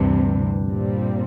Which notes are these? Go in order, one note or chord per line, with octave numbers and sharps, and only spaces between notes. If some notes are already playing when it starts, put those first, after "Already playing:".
Already playing: D2 G2 C3 E3
A#2 G3 C4